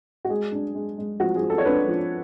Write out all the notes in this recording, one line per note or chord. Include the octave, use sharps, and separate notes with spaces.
F#4
G#3 G#4
D4
G#3
G#3
F3 F#4
G#4
F3
A4
C#5
D4 B4
F3